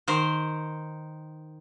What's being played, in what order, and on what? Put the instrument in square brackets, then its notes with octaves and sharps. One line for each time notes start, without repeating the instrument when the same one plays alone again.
[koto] D#3 A#4 C5